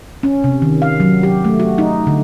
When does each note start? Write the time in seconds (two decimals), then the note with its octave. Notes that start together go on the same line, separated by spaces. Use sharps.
0.23 C#4
0.44 C3
0.62 D#3
0.82 F5
1.00 F#3
1.23 G4
1.45 A3
1.60 F#4
1.78 D#4
2.07 D3